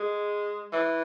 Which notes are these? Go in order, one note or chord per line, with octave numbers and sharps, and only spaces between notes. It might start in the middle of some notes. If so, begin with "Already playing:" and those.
Already playing: G#3
E3